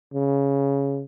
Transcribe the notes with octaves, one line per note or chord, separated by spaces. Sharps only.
C#3